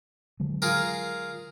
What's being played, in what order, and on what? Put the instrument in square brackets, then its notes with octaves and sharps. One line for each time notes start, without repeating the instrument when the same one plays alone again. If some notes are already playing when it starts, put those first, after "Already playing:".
[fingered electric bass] D3 F#3 G#3
[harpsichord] F4 G#4 A#4